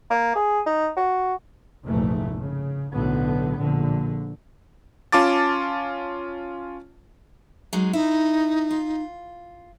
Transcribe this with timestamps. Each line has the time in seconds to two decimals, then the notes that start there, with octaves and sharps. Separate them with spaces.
0.11 A#3
0.35 G#4
0.66 D#4
0.97 F#4
1.86 F1 A#1 G#2 E3 A3
2.41 C#3
2.93 B1 A2 D3 B3
3.58 A#1 D3
5.12 C#4 F4 A5 D6 A6
7.73 F#3 G#3 D#4
7.93 D#4 E4
8.71 F4